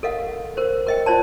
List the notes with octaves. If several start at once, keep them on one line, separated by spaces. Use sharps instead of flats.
A4 A#4 D#5 F5 F#5
A#4 C5
A#4 D#5 G5
F4 C5 D5 A5